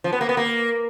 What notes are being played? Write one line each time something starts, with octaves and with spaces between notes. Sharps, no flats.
F3
B3
A#3
B3
A#3